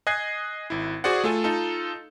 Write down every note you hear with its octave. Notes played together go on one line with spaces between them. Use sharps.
D#5 G#5 F#6 G#6 C7
G#1 E4
F#4 G#4 C5 D5 F#5
A3 F4 A4 G#5
D#4 F4 A4